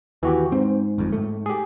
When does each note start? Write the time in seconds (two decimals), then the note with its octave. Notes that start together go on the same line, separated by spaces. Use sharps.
0.23 D#2 E3 F#4 G4
0.52 G#2 C4
0.98 G1 F2
1.12 G#2 A3
1.46 G4 G#4